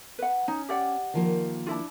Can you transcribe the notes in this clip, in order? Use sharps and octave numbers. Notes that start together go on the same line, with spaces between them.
B4 F#5
C#4 D#4
G4 D5 F#5
D#3 F3 A#3
D4 E4 F4